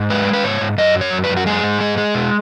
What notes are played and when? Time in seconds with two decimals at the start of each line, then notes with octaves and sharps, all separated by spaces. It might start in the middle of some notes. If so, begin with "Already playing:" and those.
Already playing: G#2
0.10 G#3 B4
0.27 G#3
0.33 B4
0.44 G#2 C#5
0.61 G#2
0.78 F#2 D#5
0.95 F#3
1.01 C#5
1.13 F#2
1.24 B4
1.29 F#2
1.37 F#4
1.46 G#3 G#4
1.64 G#2
1.81 G#3
1.98 G#3
2.15 B2